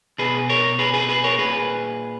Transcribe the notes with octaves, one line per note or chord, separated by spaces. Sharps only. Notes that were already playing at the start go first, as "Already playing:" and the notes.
B2 G#4 B4
A#4 C#5
G#4 B4
G#4 B4
G#4 B4
A#4 C#5
A#2 G#4 B4